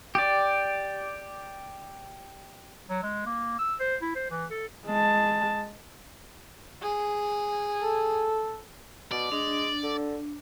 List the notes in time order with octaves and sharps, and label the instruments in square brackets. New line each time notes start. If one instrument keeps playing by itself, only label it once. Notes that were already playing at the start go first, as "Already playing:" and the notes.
[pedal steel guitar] G4 D5
[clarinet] F#3
G#3
A#3
E6
C5
E4
C5
E3
A4
[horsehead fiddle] G#3 A5
[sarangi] G#4
[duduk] A4
[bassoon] B2 [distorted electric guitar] D5
[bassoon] G#3 [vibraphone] D4
[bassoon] D3